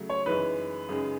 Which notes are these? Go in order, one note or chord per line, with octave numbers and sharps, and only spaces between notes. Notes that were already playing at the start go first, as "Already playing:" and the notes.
Already playing: C#3 F#3 A3
C#5
F#2 E3 G#3 D#4 B4
F#2 C#3 G#3 D#4 G#4